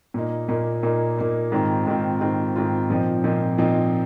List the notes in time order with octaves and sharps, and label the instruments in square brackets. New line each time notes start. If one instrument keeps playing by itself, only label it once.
[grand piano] A#2 A#3 D#4
A#2 A#3 D#4
A#2 A#3 D#4
A#2 A#3 D#4
G#2 D#3 C4 F4
G#2 D#3 C4 F4
G#2 D#3 C4 F4
G#2 D#3 C4 F4
A#2 F3 C4 D#4
A#2 F3 C4 D#4
A#2 F3 C4 D#4